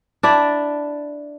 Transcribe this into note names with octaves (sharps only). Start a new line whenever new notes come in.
D4 E4 D5